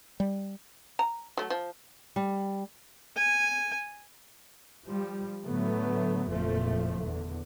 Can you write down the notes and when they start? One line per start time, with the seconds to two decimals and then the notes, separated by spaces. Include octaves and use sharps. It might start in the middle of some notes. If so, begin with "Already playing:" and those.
0.20 G3
0.99 A#5
1.37 F#3 A3
1.50 F3
2.16 G3
3.16 G#5
4.86 F3 G3
5.44 A2 D3 F#3 A3 B3
6.28 F#1 F2 A#2 F3 A3
7.02 E2 D3